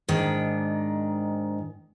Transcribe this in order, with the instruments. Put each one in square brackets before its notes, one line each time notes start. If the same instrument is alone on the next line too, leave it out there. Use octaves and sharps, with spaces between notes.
[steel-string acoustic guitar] G#2 D#3 D4